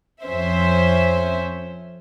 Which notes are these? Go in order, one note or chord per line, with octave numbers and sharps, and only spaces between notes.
F2 C#4 C5 E5